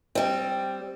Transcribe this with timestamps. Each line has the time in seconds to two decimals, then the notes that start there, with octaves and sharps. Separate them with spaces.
0.15 G3 C4